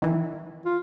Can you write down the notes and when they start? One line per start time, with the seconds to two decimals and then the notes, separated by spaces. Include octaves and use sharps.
0.02 D#3 E3
0.65 F4